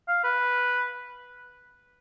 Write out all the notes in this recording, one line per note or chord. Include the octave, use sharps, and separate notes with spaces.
F5
B4